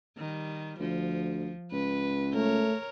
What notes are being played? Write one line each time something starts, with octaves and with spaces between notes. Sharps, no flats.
D#3 G3
D2 F3
C#2 B4
A3 A#4 C#5